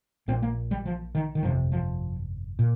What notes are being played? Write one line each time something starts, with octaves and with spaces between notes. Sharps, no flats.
A#1 A#2 C4
A#3
G3
F3
D#3
D#3
G1 F2 C3 F3
F3
A#2